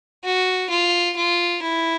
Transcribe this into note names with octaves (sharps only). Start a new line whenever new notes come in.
F#4
F4
F4
E4